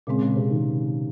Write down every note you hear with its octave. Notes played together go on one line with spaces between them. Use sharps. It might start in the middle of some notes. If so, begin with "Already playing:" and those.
A#2 C#3 G#3 C4
C#3
C3
D#3